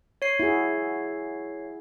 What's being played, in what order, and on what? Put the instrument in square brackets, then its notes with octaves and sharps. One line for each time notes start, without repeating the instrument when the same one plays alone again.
[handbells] C#5 C7
[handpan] E4 F#4 G#4